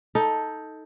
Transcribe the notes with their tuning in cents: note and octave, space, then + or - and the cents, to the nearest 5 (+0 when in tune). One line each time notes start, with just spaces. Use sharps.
D#4 +15 A4 +0